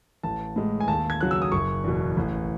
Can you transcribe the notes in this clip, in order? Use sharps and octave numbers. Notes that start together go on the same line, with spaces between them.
A1 A5
A2 G#3
G#5
D#2 A5
G#6
C#3 F#3 F#6
E6
D#6
F#1 C#6
E2 B2
A1